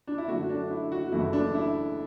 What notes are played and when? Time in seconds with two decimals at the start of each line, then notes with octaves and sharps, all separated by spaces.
0.07 D4
0.18 E4
0.28 F#2 D3 A3 F#4
0.49 D4
0.70 E4
0.92 F#4
1.12 F#1 F#2 E3 A3 E4
1.33 D4
1.55 E4